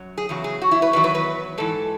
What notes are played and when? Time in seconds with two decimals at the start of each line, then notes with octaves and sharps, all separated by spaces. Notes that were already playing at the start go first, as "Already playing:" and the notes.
Already playing: F#2 F#3
0.18 G#4
0.29 E2 C#3 F#3
0.44 G#4
0.62 F#4
0.71 E4
0.82 B4
0.93 E2 D#3 F#3 B4
1.04 B4
1.15 B4
1.58 G#2 E3 A4